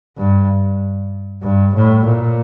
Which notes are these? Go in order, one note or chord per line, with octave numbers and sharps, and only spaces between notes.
G2
G2
A2
A#2